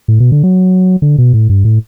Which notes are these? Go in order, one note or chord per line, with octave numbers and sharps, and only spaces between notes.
A2
B2
D3
F#3
D3
B2
A2
G2
A2